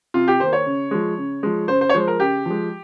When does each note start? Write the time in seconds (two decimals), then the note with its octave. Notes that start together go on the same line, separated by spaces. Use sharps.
0.14 C3 F4
0.28 G4
0.40 D#3 A#3 C5
0.53 C#5
0.66 C#3
0.91 F3 G#3
1.18 C#3
1.43 F3 G#3
1.68 C#3 C5
1.81 C5
1.89 C#5
1.94 F3 G#3 C5
2.08 A#4
2.20 C#3 G4
2.46 F3 G#3